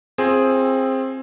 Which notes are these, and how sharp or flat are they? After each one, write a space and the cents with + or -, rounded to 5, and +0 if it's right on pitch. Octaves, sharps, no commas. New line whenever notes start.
C4 +15 F4 +0 G#4 +0